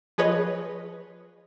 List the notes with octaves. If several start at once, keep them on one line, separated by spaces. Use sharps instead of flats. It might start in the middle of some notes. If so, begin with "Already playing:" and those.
F3 G#4 B4 C#5 D#5